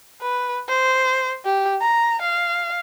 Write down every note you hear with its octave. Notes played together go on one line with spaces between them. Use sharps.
B4
C5
G4
A#5
F5